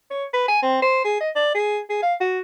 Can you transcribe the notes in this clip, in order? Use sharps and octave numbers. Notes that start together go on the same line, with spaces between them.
C#5
B4
G#5
C4
C5
G#4
D#5
D5
G#4
G#4
F5
F#4